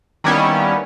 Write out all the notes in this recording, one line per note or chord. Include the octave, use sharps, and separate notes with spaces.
D#3 G3 A#3 B3 C#4 E4